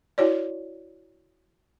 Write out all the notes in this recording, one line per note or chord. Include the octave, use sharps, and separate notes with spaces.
E4 F#4 C#5 D5